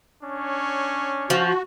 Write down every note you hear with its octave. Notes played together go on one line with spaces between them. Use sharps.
C#4 D4 C#5
F3 F#4